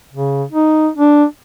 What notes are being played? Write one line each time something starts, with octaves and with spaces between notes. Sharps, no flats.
C#3
D#4
D4